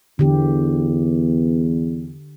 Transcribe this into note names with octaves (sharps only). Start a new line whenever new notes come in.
E2 D3 G4